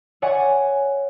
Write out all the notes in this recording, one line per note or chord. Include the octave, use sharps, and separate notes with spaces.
C#5 D5 E5 F#5 G#5 C#6